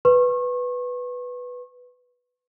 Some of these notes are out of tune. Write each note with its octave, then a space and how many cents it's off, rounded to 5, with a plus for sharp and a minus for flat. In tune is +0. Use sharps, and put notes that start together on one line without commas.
B4 +0 C#6 -35